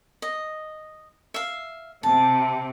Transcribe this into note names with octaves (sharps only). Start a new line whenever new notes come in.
D#5
E5 F5
C3 A5